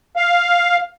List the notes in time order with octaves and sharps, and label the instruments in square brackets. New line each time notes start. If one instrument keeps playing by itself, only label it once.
[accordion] F5